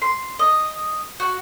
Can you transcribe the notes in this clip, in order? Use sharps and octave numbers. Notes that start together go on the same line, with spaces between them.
C6
D#5
F#4